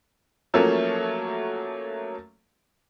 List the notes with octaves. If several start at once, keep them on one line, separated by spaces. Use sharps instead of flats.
F3 F#3 A3 A#3 C#4